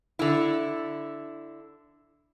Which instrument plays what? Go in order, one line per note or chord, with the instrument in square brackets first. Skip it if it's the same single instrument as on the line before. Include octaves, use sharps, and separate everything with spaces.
[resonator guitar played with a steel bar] D3 E4